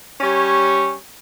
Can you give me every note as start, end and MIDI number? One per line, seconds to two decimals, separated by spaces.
0.20 0.94 55
0.20 0.94 61
0.20 0.94 73